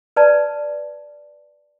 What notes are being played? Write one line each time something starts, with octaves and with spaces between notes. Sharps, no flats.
B4 D5 A5